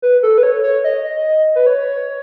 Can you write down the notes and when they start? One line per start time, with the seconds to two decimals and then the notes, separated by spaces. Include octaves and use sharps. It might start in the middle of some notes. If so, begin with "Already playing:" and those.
0.02 B4
0.23 A4
0.38 B4
0.43 C#5
0.63 C#5
0.84 D#5
1.55 B4
1.67 C#5